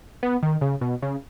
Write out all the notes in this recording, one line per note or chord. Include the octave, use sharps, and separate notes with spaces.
B3
D#3
C#3
B2
C#3